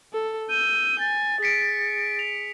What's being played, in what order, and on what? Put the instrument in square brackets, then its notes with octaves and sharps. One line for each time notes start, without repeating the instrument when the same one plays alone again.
[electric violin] A4
[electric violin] E6 G6 [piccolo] D#7
[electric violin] G#5 [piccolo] A6
[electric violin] G#4 [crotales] B6 C#7 D7
[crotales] F7